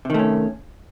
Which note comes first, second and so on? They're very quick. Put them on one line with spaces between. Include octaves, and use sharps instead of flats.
C3 D#3 A3 C#4